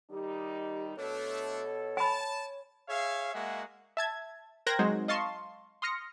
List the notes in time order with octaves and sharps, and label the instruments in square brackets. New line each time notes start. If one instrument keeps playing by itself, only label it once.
[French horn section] D#3 G3 D#4 [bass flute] G4
[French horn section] B2 A4 [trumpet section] A3 D4 [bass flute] C#5
[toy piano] G#5 B5 [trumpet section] A5
[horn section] G#4 C#5 E5 F5
G#3 A#3 F#4 G#4 E5 F#5
[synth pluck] E5 A5 G#6
A#4 C5 G5 F#6 G#6 A#6
F#3 G#3 C4 D#4 F#4 C5
D#5 F5 A5 C6 C#6
C6 D#6 F6 A#6 C#7